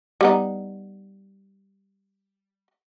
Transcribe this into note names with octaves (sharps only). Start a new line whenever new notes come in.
G3 B3 D#4